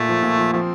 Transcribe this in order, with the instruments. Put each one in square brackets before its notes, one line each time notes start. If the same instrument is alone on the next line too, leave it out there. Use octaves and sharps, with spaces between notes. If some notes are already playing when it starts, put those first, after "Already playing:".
Already playing: [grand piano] A#2 [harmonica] A3
[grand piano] F3
A#2
F3
[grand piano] F3 [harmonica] A3 C4